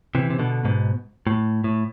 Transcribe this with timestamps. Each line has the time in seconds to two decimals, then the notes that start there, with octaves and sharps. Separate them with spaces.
0.15 C3 E3
0.30 C3
0.39 B2 D3
0.65 G#2 B2
1.27 A2
1.64 A2